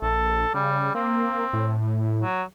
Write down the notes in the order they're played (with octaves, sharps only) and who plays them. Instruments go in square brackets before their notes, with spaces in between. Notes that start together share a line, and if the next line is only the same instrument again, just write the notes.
[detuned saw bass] A#1 [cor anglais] A4
[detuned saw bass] C#3 [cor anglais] G3
[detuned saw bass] A#3 [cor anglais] C4
[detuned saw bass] A2
[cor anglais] F#3